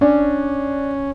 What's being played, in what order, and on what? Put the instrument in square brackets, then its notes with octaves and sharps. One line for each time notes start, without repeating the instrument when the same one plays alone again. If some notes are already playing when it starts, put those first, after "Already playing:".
[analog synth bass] C#4 [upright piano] D4